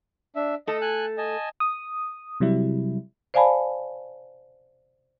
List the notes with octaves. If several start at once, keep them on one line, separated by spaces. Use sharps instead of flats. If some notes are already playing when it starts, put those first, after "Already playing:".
D4 E5
A3 A4 D#5
G#5 F#6
D#5 G#5 A5
D#6
C3 F#3 G3 E4
C5 D5 F5 G#5 A5 B5